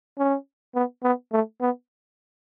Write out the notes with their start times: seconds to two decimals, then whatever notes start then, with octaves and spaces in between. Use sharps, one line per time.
0.18 C#4
0.75 B3
1.04 B3
1.32 A3
1.61 B3